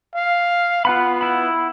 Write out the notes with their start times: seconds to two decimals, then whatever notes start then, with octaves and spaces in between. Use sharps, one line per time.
0.15 F5
0.85 B3 F4 F#5 B5
1.21 E4 B5